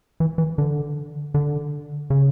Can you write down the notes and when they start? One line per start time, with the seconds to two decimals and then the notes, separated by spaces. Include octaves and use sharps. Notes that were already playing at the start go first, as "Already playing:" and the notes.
0.20 E3
0.38 E3
0.58 D3
1.34 D3
2.10 C#3